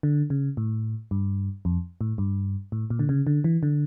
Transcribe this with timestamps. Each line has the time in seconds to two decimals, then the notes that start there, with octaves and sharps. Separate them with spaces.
0.03 D3
0.30 C#3
0.57 A2
1.11 G2
1.65 F2
2.01 A2
2.18 G2
2.72 A2
2.90 A#2
2.99 D3
3.09 C#3
3.27 D3
3.44 E3
3.63 D3